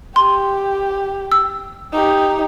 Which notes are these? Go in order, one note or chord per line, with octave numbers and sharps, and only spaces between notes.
G4 C6
E6
D#4 G4